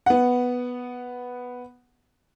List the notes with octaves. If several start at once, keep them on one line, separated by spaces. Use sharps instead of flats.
B3 F#5